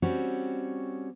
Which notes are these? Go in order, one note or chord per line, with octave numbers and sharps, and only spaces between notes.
G3 C4 C#4 F#4